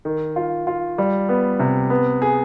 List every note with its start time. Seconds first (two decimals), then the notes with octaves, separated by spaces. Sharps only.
0.05 D#3
0.36 F4
0.67 F4
0.98 G3
1.29 B3
1.59 C3
1.90 B3
2.22 G#4